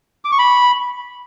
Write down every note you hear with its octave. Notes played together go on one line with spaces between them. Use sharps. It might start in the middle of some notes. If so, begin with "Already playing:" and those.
D6
C#6
B5